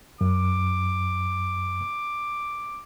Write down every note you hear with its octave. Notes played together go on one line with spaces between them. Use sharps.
F#2 D6